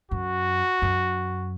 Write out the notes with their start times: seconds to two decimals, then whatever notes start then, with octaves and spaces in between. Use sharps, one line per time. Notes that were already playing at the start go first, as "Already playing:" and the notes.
0.11 F#2 F#4
0.82 F#2